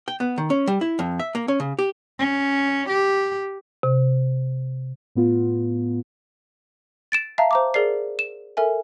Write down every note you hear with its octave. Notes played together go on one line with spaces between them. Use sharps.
G5
B3
D#3
C#4
G3
E4
F2
E5
A#3
C#4
C#3
G4
C#4
G4
C3
A2 B3 F4
A6 D7 E7
E5 F5 A5 A#5
C5 A#5 D6
G#4 A#4 D5 C7
E7
A4 A#4 E5 G#5